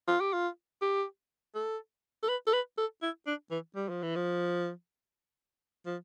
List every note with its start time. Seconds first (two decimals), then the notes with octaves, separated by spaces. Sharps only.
0.08 F4
0.21 G4
0.33 F4
0.82 G4
1.55 A4
2.23 A4
2.29 B4
2.47 A4
2.53 B4
2.78 A4
3.02 E4
3.27 D4
3.51 E3
3.76 G3
3.89 F3
4.03 E3
4.16 F3
5.86 F3